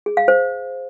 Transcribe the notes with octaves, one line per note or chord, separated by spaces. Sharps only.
G#4
F5
C5